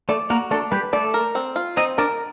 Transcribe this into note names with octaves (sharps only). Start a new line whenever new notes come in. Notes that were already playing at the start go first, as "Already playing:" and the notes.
A3 A4 D5
A#3 F#4 A#4
A3 D4 A4
G3 G4 B4
A3 A4 D5
A#4
C4
F4
C4 D#4 D#5
D4 A#4 D5